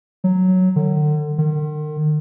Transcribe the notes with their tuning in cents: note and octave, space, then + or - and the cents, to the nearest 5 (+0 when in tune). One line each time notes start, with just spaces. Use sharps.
F#3 +0
D3 +35
D#3 -40